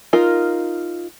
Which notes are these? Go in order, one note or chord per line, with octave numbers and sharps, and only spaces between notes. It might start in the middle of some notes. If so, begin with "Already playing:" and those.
D#4 F4 A#4